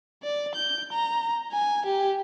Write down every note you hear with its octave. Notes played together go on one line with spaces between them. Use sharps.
D5
G6
A#5
G#5
G4